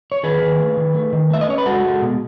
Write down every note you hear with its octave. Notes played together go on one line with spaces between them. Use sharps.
C#5
D#3 G#4 B4
D#3
A3
D#3
A3
D#3
A3 E5
D#5
C#4 C#5
B4
G#3 F#4 A4
G#3
B2